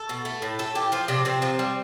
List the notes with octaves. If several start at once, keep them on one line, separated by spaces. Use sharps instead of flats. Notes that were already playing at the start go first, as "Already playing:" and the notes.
Already playing: A4
B2
A3
A2
A3 A4
E3 G4
F3 F4
C3 D4
C3 C4
F3
G3